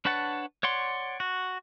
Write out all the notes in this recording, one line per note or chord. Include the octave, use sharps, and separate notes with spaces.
D4 B4 C#5 F#5 A5
C#5 D5 F#5 C6
F#4